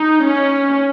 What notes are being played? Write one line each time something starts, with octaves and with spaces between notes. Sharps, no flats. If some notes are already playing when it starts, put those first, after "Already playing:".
Already playing: D#4
C#4